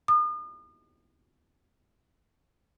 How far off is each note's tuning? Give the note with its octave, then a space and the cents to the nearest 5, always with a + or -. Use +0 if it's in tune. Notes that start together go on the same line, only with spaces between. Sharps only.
D#6 -40